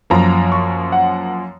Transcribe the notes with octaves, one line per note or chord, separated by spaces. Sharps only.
F#2 F3 A#3 A#5
C#6
F#5